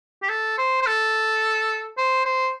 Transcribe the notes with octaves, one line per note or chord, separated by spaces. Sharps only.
G4
A4
C5
C5
A4
C5
C5